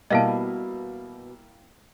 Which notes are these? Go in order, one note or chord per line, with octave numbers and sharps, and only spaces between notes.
B2 G3 A#3 E4 D#5 F5 A5